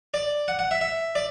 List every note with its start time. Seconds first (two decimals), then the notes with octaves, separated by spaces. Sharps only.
0.14 D5
0.48 F#5
0.59 F#5
0.71 E5
0.81 E5
1.15 D5